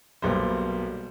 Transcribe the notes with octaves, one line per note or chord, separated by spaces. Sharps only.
B1 B2 G3 A#3 C5